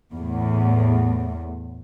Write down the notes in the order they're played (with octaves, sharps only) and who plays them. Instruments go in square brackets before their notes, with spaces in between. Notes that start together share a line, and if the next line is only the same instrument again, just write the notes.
[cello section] E2 A2